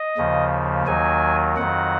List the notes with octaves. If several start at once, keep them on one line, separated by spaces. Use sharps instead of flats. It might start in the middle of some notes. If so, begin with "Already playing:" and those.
Already playing: D#5
D#2 C#3 F3
D#2 D#3 F#3 G#5
F2 D#3 F#3 F#5